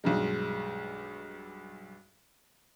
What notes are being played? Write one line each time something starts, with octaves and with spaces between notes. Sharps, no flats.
B1 G2 G#3